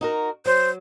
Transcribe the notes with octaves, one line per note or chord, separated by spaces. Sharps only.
D#4 F#4 A#4
F#3 C5